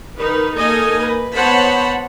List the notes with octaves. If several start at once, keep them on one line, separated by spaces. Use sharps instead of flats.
D#3 D#4 B4
A#3 D#4 A4 D#5 G#5
B4
B3 C5 C#5 F#5 A5 B5